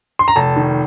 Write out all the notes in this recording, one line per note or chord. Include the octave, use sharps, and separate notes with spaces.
C6
A#5
F1 A5
D#3